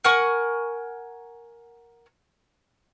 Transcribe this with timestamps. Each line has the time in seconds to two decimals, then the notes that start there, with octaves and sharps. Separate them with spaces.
0.04 A#4 F#5 G#5 C#6